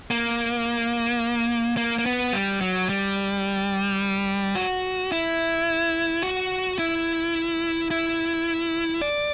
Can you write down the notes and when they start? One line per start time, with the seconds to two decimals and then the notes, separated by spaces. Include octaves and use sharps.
0.11 A#3
1.77 A#3
1.98 A#3
2.06 B3
2.33 G3
2.61 F#3
2.89 G3
4.55 F#4
5.12 E4
6.23 F#4
6.79 E4
7.91 E4
9.02 D5